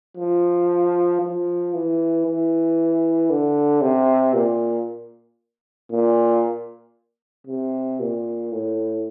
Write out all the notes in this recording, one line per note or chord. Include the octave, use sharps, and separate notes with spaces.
F3
F3
E3
E3
D3
C3
A#2
A#2
C3
A#2
A2